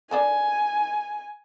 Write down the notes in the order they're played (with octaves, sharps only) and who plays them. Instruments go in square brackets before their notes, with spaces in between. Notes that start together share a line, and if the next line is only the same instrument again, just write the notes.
[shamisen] D4 A4 A#4 [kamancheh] G#5